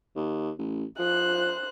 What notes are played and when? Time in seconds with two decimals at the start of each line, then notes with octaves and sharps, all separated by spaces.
0.16 D#2
0.58 A1
0.99 F3 C5 F#6